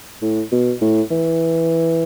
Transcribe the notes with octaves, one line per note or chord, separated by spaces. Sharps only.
A2
B2
A2
E3